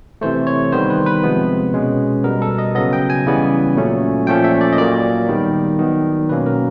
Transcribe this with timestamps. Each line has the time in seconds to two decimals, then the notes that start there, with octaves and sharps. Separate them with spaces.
0.21 C3 E3 A3 C5
0.47 C#5
0.72 D#3 G3 B3 C5
0.90 B4
1.06 B4
1.23 C3 F3 G#3 B3
1.73 B2 G#3 C#4
2.24 B2 G3 B3 A#4
2.42 A4
2.58 D#5
2.75 C#3 F#3 B3 D#5
2.93 G5
3.10 G#5
3.26 C#3 E3 G3 B3
3.76 A#2 F#3 A3 C#4
4.27 A#2 F3 A3 C#4 G5
4.44 E5
4.61 D5
4.73 D#5
4.77 A#2 F#3 A#3 D5
5.29 D#3 G3 B3
5.79 D#3 F#3 B3
6.29 B2 F#3 A#3 C#4 B4
6.46 A#4